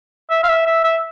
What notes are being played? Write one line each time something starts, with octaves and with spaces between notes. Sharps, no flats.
E5
F5
E5
E5
E5